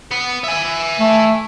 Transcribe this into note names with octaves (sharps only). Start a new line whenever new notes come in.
B3
E5 G#5
A3